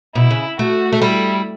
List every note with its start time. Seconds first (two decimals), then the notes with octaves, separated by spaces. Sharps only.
0.15 B2 E4
0.30 C#3
0.59 A3 F#4
0.92 A3
1.01 G3 E4